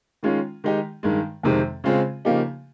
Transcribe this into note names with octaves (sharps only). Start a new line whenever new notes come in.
D#3 G#3 C#4 F4
D#3 G#3 D#4 G4
G2 D#3 G#3
F2 C3 D#3 G#3 C4
C#3 G#3 C4 F4 G#4
C#3 F3 A#3 D#4 G4